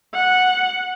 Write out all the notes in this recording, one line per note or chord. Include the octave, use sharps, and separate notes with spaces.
F#5